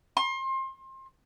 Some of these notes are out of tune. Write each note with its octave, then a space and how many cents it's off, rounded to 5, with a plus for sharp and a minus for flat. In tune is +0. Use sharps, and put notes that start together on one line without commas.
C6 +30